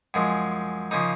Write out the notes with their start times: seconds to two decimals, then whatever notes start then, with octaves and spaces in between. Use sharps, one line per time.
0.14 F#2 F3 G#3
0.91 C#3 F3 A#3 D#4